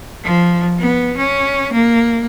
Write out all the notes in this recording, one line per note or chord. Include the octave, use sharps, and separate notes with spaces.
F3
B3
C#4
A#3